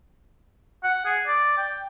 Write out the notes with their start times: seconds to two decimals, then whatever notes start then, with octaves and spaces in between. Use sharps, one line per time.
0.84 F#5
1.05 G#4
1.27 D5
1.57 G5